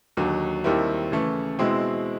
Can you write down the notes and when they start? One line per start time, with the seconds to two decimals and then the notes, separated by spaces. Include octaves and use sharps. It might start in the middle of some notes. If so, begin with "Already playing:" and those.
0.17 D#2 D3 F#3
0.64 D#2 D#3 G3 C4 E4
1.11 C#3 E3 A3
1.59 B2 G#3 C4 E4